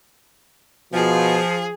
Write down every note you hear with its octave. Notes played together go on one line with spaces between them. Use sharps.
B2 F3 G#4